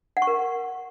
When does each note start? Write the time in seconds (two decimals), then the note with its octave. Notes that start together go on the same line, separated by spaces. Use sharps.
0.17 F#5
0.22 C#6
0.27 A#4